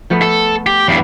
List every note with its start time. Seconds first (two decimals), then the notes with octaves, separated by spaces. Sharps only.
0.10 F3 A3 B3
0.22 A4
0.66 G4
0.88 E2 G2 B3